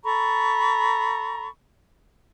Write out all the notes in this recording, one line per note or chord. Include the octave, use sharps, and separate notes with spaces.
A4 A#5 B5 C#6